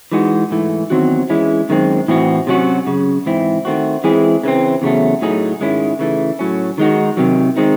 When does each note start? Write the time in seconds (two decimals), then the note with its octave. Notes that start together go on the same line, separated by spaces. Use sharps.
0.12 E3 G#3 D#4 F#4
0.51 G#2 E3 A3
0.90 E2 D#3 F#3 C4 F#4
1.30 E3 G#3 C#4 E4
1.69 F#2 D#3 G#3 C4
2.08 A2 E3 C4 F#4
2.47 C3 F#3 C#4 F#4
2.86 F#2 C#3
3.26 G#2 E3 C4 E4
3.65 D#3 A3 C4 F#4
4.04 E3 G#3 C4 E4 G#4
4.43 C#3 E3 C4
4.82 E2 C#3 F#3 A3
5.21 A2 F#3 A3 D#4 G#4
5.61 G#2 D#3 G#3 C#4 E4
5.99 C#3 E3 A3
6.39 A2 F#3 C#4
6.78 D#3 G#3 D#4 F#4
7.17 C3 D#3 F#3
7.57 D#3 G#3 C4 D#4